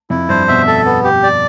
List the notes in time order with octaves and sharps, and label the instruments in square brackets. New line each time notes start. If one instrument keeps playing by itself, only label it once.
[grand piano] F2 [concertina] E4
[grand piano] G2 [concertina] C5
[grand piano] B2 [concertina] E5
[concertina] A4
B3
G4
D5